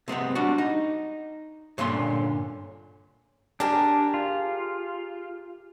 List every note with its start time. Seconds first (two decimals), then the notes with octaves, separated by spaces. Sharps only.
0.08 C3 G#3 B3 C4
0.35 G3 D4 F#4
0.58 D#4
1.78 G2 A#2 D3 C#4 C6
3.60 D4 G4 G#4 A#4
4.14 F4